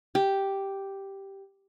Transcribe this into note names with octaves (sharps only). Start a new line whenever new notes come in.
G4